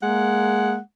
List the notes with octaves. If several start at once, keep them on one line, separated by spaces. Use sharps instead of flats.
G#3 A#3 F#5